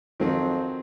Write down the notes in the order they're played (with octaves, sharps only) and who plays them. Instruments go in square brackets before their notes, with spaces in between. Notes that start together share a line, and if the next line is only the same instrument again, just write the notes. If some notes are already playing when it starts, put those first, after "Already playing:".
[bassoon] F2 [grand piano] D#3 F#3 C4